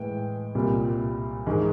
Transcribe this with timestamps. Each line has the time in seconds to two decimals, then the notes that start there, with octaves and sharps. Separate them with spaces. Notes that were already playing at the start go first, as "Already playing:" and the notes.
Already playing: A2 E3 G#3 G5
0.55 C2 A#2 G3
1.47 G#2 D#3 G#3